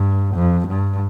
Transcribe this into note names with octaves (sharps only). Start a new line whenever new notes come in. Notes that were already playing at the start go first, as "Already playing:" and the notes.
Already playing: G2
F2
G2